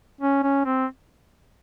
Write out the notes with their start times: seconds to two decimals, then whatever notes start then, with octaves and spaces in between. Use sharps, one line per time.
0.21 C#4
0.43 C#4
0.66 C4